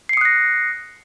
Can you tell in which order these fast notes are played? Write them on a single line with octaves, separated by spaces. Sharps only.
C7 C#7 D#6 F#6 A#6